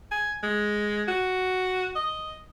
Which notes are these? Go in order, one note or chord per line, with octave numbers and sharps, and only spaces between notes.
G#5
G#3
F#4
D#5